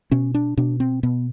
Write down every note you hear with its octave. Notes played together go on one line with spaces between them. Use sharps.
B2 C#4
D4
B2 D4
C4
B2 B3